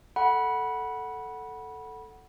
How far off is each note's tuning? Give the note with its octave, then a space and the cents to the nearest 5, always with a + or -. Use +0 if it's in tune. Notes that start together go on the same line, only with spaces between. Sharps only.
A4 +0 F#5 +5 B5 -20